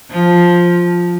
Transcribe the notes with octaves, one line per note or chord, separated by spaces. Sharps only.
F3